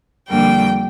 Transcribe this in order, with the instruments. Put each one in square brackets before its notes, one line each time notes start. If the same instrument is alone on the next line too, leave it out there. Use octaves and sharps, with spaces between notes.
[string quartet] F2 D3 G3 A#3 G5